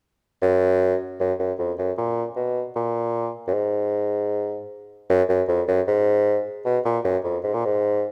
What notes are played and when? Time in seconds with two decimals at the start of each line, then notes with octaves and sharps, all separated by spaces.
0.42 F#2
1.20 F#2
1.40 F#2
1.59 F2
1.79 F#2
1.98 A#2
2.36 B2
2.76 A#2
3.48 F#2
3.54 G#2
5.10 F#2
5.29 F#2
5.48 F2
5.68 F#2
5.88 G#2
6.66 B2
6.86 A#2
7.04 F#2
7.24 F2
7.44 G#2
7.54 A#2
7.66 G#2